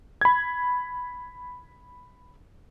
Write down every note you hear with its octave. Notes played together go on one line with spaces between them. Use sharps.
B5 G#6